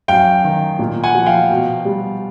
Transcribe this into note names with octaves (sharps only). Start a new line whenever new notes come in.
F#2 F5 G5
D#3
A#2
F#5 G#5
F3
F5 G5
B2
G3